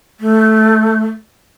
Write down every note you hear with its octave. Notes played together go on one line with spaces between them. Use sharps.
A3